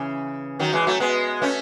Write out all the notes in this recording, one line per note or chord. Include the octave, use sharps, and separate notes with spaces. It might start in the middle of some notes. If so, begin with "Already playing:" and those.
Already playing: C#3 E3
D#3 F#3
E3 G#3
F#3 A3
G#3 B3
A3 C#4